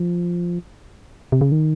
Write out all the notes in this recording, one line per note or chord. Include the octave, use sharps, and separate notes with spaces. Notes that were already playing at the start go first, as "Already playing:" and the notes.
Already playing: F3
C3
C#3
D#3